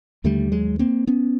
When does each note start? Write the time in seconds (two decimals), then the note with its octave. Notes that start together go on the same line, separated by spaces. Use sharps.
0.24 D#2 D3 G3 A3
0.52 F#3 G#3
0.79 A#3 C4
1.07 B3 C#4